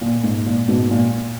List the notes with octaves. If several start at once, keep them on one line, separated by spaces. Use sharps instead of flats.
A#2
G#2
A#2
G#2 B2
A#2